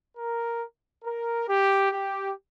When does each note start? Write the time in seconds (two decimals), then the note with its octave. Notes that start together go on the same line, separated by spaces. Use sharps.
0.18 A#4
1.04 A#4
1.48 G4
1.91 G4